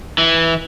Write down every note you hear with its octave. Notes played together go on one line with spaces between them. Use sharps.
E3